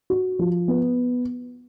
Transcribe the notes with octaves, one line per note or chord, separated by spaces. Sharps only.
F#4
F3
B3